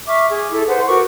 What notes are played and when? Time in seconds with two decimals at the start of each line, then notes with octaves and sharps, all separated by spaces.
0.07 E5 C#6 D6 F6
0.29 G#4
0.51 E4 A4
0.67 B4 C5 F#5
0.88 F#4 A#4 C#6 D6